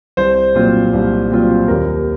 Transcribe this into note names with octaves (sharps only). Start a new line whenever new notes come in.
C2 C5
A#2 F#3 C4 F4
C2
A#2 F#3 C4 F4
D#2 A#4